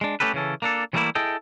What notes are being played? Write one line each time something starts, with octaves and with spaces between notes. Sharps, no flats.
G#3 D4
A3 C#4 G4 A4 B4
C#3 E3 C#4 A4
A#3 D4 A4
E3 F#3 G3 A3 A#3 E4
E4 G#4 A4 D#5 G5